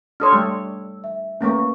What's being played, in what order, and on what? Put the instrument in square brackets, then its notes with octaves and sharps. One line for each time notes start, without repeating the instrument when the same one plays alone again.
[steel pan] D4 A4 C#5 [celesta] C6 D#6 F6
[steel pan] G3 A3 [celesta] E6
[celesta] E5
[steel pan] A3 A#3 C#4 [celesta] B4 C#6